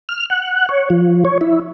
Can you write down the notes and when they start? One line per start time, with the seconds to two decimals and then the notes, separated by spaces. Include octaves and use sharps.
0.09 F6
0.30 F#5
0.69 C#5
0.90 F3
1.25 C#5
1.41 E4